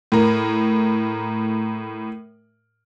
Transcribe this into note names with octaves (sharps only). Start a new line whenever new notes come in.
A2 A#4